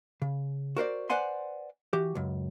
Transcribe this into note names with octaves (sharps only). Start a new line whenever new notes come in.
C#3
F#4 A#4 C5 D5
B4 C5 D5 F#5 G#5 C6
E3 F#4 G4
C#2 F#2